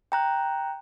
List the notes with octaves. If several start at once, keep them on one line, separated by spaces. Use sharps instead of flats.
G5 A#5 F#6